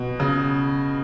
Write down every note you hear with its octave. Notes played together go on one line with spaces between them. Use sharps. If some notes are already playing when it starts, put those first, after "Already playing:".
Already playing: B2
C#3